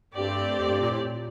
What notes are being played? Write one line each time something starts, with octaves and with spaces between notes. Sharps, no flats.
G2 A3 C4 G4 D5
F2
G2
A#2
A2
A#2